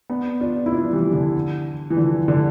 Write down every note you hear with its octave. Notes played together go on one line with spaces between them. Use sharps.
B3 D4
D4 F4
E4
D4 F4
F3
E3 G3
D3
E3
D3 F3
D3